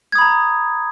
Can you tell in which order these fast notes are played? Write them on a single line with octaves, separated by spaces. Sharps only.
G#6 D#6 B5 A#5